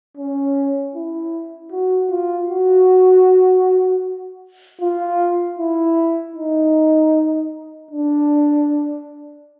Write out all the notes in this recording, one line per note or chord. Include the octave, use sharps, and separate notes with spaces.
C#4
E4
F#4
F4
F#4
F4
E4
D#4
D4